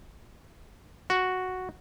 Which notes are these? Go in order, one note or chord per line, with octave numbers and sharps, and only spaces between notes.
F#4